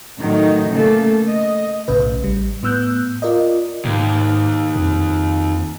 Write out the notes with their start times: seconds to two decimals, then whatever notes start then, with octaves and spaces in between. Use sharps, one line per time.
0.20 A2 D#3 F#3 D#4
0.70 C#3 A3 A#3 A4
1.29 D#5
1.88 B1 A2 C#3 B4
2.23 A1 G3
2.63 A2 B3 E6 F#6 G6
3.22 F4 A#4 D5 D#5
3.85 D#2 G#2
4.76 F2